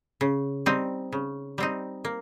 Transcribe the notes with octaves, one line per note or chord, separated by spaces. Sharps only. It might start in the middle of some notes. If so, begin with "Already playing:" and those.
C#3
G3 C4 D#4
C#3
G3 C4 D#4
A#3